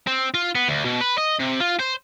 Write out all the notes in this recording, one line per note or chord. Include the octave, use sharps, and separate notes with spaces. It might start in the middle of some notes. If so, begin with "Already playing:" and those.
C4
F4
B3
D2
B2
B4
D#5
C3
F4
C5